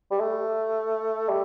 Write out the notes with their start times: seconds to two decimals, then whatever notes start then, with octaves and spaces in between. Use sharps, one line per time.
0.11 G3
0.20 A3
1.29 G3